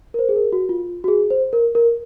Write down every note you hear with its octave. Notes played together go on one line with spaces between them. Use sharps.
A#4
C5
G#4
A#4
F#4
F4
F#4
G#4
C5
A#4
A#4